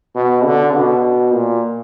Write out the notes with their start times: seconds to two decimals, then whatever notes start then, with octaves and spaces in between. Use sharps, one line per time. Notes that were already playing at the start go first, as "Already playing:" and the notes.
0.16 B2
0.45 D3
0.74 B2
1.33 A#2